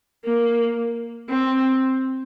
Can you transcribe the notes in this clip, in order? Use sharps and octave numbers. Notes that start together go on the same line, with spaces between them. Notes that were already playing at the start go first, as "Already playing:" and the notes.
A#3
C4